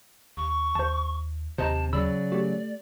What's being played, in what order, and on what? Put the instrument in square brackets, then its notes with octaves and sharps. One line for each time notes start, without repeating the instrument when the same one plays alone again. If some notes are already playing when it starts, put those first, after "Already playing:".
[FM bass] D#2 [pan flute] C#6
[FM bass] D#2 [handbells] C5 A5
[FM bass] D#2 [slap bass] C3 [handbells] C5 D#5 A#5 [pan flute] A5
[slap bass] C#3 F#3 [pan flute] D5 [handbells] B5 E6
[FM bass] A3 [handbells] F#4 G4